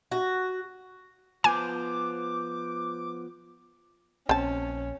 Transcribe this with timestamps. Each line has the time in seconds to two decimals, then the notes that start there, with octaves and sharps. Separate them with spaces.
0.11 F#4
1.44 F3 B3 C5 G#5 D6
4.29 A#1 C4 C#4 A5